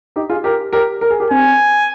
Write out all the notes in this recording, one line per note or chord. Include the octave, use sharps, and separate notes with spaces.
D#4 G4
F4 G#4
G4 A#4
G4 A#4
A#4
G#4
G4 A#4
C4 G#5